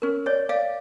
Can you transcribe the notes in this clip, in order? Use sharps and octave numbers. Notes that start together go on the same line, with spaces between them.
C#4 A#4
C#5 D5
D5 F5